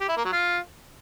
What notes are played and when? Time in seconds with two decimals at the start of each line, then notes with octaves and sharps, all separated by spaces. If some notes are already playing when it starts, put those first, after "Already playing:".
0.01 G4
0.09 E4
0.17 A#3
0.25 F#3
0.33 F4